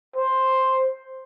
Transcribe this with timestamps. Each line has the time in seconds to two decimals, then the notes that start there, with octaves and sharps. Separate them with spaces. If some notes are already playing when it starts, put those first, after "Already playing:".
0.16 C5